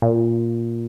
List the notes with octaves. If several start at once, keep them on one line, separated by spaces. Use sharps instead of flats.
A#2